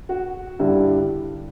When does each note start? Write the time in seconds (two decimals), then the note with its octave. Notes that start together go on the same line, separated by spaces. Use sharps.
0.09 F#4
0.59 G2 D3 G3 E4 G4